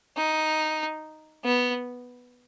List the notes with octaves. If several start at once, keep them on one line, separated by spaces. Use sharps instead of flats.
D#4
B3